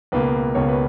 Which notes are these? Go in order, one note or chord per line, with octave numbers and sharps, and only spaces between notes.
C#2 B2 A#3 B4
C#2 B2 A#3 C#5
B4